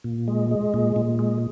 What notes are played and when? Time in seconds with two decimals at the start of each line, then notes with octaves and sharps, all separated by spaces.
0.04 A#2
0.28 G#3
0.51 G#3
0.74 A#2
0.96 A#2
1.19 G#3